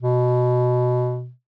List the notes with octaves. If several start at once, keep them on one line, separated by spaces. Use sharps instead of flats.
B2